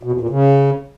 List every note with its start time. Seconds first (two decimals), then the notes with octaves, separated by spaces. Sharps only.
0.03 B2
0.12 E2
0.21 A#2
0.29 C#3